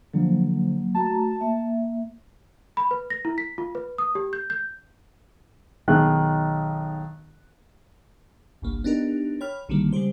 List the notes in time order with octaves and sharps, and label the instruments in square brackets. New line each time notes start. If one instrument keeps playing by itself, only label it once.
[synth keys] D3 F3 [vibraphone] F#3 A#3
[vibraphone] A3 F#4 A#5 [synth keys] A5
[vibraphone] A#3 E5
[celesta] B5
B4
A#6
E4
B6
F4
B4
D#6
G4
G6
G6
[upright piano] B1 D#3 G#4 F#6
[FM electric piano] G1 C2 A#3
B3 D4 D#4 G4 A#4
C#5 G5 B5 F6
B1 D3 D#3 G3 A#3
C#3 G3 G#3 G4 C5